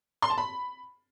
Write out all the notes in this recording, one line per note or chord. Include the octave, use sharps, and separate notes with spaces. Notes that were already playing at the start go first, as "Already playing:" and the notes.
C6
A5
B5